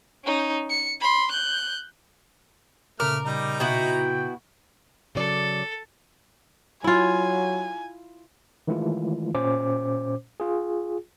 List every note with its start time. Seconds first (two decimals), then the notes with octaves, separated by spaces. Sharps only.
0.24 C#4 D#4
0.70 C#7
1.00 B5 C6
1.31 F#6 G6
3.00 A#2 C#3 A3 A#4 D6 F6
3.26 G3 D#4 A#5
3.60 B2 E4 F#4 G5
5.15 C#3 F#3 A4 D5
6.84 F#3 E4 F4 G#5
8.68 D#3 E3 G#3 A3 E4 F4
9.35 A#2 C#4 C5 D6
10.40 F4 G#4